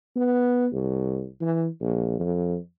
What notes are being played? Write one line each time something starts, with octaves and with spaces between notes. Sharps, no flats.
B3
C2
E3
A#1
F2